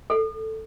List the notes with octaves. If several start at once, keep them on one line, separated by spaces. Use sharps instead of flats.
A4